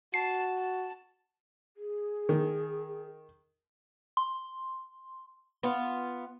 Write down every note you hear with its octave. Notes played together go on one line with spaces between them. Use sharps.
F#4 A5 C7
A5
G#4
D#3
C6
B3 F4